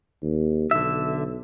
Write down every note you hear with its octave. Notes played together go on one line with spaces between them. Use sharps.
D#2
B1 D3 E5